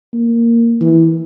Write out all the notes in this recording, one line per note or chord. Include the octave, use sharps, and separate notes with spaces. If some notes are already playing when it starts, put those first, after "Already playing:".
A#3
E3